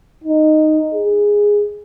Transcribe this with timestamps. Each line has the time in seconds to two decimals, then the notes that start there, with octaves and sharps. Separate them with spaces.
0.24 D#4
0.94 G#4